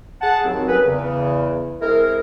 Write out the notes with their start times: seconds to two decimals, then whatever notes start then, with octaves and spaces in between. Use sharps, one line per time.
0.21 G#4 F#5 A5
0.45 D#2 F#3 C4
0.67 A#3 C#4 G#4 B4
0.86 E2 C#3
1.81 G#3 C4 E4 A#4